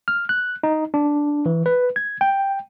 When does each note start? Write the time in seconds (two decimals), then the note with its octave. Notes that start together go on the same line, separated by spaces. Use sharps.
0.08 F6
0.29 F#6
0.63 D#4
0.94 D4
1.46 E3
1.66 B4
1.96 G#6
2.21 G5